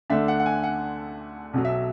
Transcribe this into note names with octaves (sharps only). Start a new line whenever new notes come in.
D2 D3 A3 D4 E5
F#5
F#5
G#5
F#5
B1 B2 F#3
E5